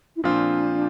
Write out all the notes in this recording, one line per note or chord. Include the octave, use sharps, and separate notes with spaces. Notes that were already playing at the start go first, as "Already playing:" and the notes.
E4
A#2 F3 C4 D4 F4